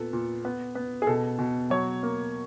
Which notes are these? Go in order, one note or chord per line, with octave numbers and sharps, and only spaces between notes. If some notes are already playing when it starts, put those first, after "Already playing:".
Already playing: A#2 B3 A4
A#2
B3
B3
G#4
B2 A4
B2
F#3 C#5
A#3